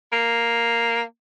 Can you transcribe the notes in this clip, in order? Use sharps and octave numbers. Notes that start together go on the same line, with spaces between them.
A#3